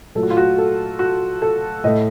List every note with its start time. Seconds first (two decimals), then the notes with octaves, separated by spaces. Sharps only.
0.15 A#2 F#3 A3 A4
0.23 F#4
0.30 F4
0.37 F#4
0.58 A4
0.99 F#4
1.42 A4
1.84 A2 A3 D#5